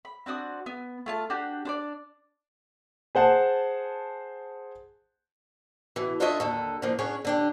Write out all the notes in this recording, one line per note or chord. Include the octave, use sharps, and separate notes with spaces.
B5
C4 D4 F#4 D#6
B3
A3 F4 A5
D4 F#4 G4
D4 C5 D5
G#4 C5 F#5 A5
B2 E3
D4 F4 A4 C#5 D#5 E5
D#2 D3 A4
D3 E3 F3 A#3
B3 C#4 D4 G#4 C#5
D3 D4 G4